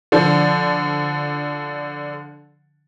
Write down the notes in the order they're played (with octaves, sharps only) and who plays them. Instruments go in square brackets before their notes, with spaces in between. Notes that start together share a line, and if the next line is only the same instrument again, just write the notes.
[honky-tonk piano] D3 F3 D4